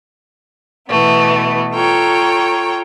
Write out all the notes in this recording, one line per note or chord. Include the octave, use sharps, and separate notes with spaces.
B2 E3 A3 B3
F4 A4 C#5 G5 A#5